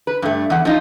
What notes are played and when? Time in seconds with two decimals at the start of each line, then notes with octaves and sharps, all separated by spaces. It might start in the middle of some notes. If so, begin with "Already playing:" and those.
0.07 B4
0.22 G2 A3
0.50 E2 F#5
0.65 F3 D#4 F4